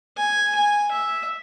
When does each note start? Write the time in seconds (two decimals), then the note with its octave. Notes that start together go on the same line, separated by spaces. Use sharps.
0.17 G#5
0.55 G#5
0.91 E5